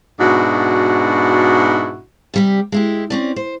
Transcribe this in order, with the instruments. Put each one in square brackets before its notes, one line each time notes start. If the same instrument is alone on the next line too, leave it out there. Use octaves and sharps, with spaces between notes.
[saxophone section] G#2 B2 D4 E4 F#4
[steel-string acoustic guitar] C3 G3 G4
G#3 E4 G4
C4 C#4 D5
C5